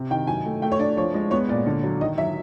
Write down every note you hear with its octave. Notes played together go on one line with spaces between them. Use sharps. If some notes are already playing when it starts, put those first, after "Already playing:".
Already playing: C3
D#3 G5
F#3 G#5
A3
A3 G5
C#5
D4 D5
F3 C#5
G#3
B3 C#5
A#2 D5
D3
F#3
D#3 D#5
F#3 E5